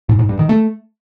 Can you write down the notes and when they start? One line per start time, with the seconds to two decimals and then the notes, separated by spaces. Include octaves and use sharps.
0.09 G#2
0.19 G#2
0.29 G2
0.39 D#3
0.49 A3